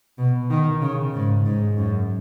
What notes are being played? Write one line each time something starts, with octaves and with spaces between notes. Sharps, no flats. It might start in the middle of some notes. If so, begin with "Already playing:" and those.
B2
D#3
C#3
G#2
G#2
F#2